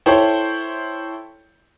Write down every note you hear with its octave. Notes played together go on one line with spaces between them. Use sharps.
E4 A4 C5 C#5 G5